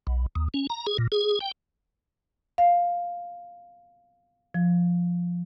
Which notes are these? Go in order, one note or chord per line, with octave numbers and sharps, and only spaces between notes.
B1
D#2
C#4
A#5
G#4
A#2
G#4
G5
F5
F3